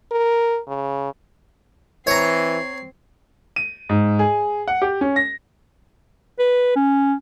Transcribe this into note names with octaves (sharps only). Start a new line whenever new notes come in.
A#4
C#3
E3 C4 C#5 A#5 C7
D#7
G#2
G#4
F#5
G4
C#4
A#6
B4
C#4